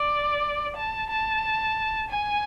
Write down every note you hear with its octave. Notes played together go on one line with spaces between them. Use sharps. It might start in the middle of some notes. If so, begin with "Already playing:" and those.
Already playing: D5
A5
A5
G#5